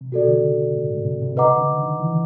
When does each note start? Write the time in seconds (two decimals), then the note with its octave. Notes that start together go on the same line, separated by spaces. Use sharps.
0.01 C3
0.12 B2 F#4 A4 D5
0.27 D3
0.32 C#3
0.75 A2
0.90 G#2
1.05 C3
1.22 C3
1.37 C#3 B4 D#5 F#5 A#5 D6
1.57 D3
1.79 D#3
2.00 E3